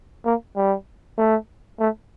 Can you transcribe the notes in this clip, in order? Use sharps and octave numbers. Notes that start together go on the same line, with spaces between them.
A#3
G3
A3
A3